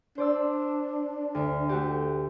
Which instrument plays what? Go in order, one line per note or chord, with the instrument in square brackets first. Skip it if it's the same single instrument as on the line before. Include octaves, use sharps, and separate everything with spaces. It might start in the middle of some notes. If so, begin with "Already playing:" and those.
[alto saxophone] D4 [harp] C5 D5 E6
[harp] D2
A3 F#4 G4